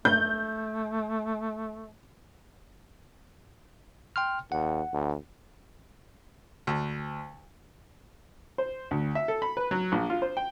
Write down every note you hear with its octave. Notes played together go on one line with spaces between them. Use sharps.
A3 G6
G5 C6 F6
D#2 F#5
D2
D2
C5
D2
E5
A4
B5
B4
F#3
A#1
F4
C5
G5